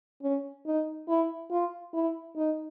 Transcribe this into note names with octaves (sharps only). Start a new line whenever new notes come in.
C#4
D#4
E4
F4
E4
D#4